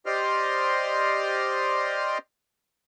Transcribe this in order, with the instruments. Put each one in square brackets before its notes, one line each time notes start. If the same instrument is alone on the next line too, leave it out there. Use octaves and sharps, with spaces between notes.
[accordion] G4 C5 D5 D#5 C6 F6